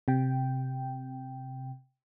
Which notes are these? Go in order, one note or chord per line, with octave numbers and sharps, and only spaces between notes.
C3 G5